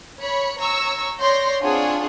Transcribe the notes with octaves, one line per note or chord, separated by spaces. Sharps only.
C#5 B5 C#7
C#5 A#5 C#6 E6
C#5 D5 C6 G6 A#6
C4 D4 F4 G#4 C#5 F#5